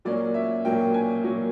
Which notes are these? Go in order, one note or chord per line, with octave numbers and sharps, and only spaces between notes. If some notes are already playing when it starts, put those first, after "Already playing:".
A#2 F#3 A#3 C#4 D5
E5
A#2 F#3 A#3 C#4 G5
G#5
A#2 F#3 A#3 C#4